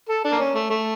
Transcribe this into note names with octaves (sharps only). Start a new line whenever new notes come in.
A4
D4
A#3
C#4
A3
A3